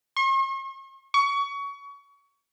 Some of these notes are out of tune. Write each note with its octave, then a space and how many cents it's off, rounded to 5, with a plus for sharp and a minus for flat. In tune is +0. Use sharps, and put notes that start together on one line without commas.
C#6 -45
C#6 +25